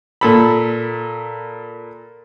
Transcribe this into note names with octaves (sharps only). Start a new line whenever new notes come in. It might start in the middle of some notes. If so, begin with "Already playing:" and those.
A#2 A4 B5